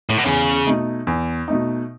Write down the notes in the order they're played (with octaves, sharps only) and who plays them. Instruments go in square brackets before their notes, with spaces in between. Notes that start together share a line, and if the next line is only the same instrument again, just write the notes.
[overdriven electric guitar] A2
B2
[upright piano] E2 [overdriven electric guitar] C#3
[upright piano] B2 A3 D#4
E2
B2 A3 D#4